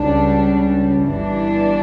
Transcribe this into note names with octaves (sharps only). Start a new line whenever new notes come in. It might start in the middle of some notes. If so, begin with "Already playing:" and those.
Already playing: C#2 C#3 G3 D4
G1 G2 E3 G3 D4